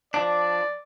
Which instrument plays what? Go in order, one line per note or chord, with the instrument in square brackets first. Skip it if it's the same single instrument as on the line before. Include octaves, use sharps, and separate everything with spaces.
[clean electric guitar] F3 D4 [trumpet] D5